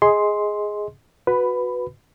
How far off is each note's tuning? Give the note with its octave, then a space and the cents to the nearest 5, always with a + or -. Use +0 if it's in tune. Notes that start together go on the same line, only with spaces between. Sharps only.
G#4 +0 D#5 +15 C6 +0
F#4 -15 B4 +0 B5 +15